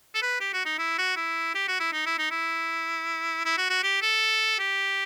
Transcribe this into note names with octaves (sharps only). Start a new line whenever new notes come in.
A4
B4
G4
F#4
D#4
E4
F#4
E4
G4
F#4
E4
D#4
E4
D#4
E4
E4
F#4
F#4
G4
A4
G4